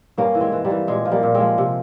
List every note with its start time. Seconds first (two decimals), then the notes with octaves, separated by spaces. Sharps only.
0.17 G2 A#3 C#4
0.35 E3
0.40 G#3 C4
0.52 E3
0.65 G3 A#3
0.70 E3
0.87 A#2 G#3
1.05 F3
1.11 G3 A#3
1.23 A#2
1.34 G#3 C4
1.40 F3
1.58 C3